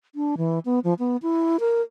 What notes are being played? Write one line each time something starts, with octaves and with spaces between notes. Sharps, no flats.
D4
E3
B3
F3
B3
E4
A#4